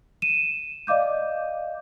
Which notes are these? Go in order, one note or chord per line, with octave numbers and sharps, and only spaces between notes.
D#7 E7
D5 D#5 F5 D6 G6